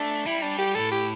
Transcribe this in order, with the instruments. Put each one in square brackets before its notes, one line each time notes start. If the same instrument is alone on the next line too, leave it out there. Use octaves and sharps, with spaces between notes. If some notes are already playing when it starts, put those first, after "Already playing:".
Already playing: [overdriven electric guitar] A3 [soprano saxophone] D4
[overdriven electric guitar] G3 [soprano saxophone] E4
[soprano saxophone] D4
G4
[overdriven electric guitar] A2 [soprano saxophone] A4
[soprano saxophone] G4